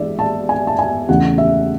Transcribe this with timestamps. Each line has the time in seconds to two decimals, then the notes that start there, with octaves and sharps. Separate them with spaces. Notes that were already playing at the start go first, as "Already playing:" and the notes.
Already playing: E3 G#3 B3 D4 D5 E5
0.19 A5
0.49 G#5
0.67 A5
0.79 G#5
1.09 E2 C#3 E3 A3 F#5
1.38 E5